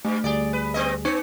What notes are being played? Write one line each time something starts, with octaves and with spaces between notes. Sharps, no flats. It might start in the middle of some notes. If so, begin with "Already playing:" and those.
G2 A3
D2 G3 G#4 D5
B4
B3 C4 D#5
B3 D#4 C#5 C#7